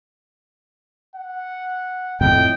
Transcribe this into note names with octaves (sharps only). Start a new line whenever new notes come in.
F#5
F2 A2 D#5 G5